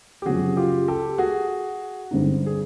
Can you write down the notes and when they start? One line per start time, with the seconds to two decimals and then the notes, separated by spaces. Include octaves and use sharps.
0.22 G4
0.26 F#2 C#3 F3 F#4 G#4
0.57 F4 G4
0.88 G4 A4
1.18 F#4 G#4
2.11 G2 D3 G3 C4 D#4
2.46 G#4